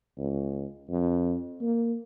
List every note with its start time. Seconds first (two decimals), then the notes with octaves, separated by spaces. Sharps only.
0.18 C#2
0.90 F2
1.61 A#3